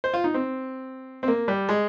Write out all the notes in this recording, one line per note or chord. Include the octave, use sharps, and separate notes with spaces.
C5
F4
D#4
C4
C4
A#3
G3
G#3